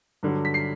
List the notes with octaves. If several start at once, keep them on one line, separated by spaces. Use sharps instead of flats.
G2 D3 F#3
B6
C7